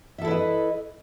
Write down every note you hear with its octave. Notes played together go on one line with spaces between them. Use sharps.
E4 A4 B4 D#5 E5